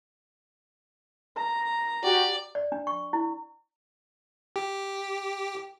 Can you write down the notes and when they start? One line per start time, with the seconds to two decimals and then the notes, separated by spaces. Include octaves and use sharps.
1.36 A#5
2.03 F#4 G4 D5
2.55 D5
2.72 D4
2.87 C#6
3.13 E4
4.56 G4